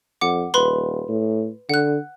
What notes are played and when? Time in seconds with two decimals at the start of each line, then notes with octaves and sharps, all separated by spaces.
0.21 F2 F#5 D6
0.54 D#1 B4 B5 C6
1.08 A2
1.69 D3 F#5 F#6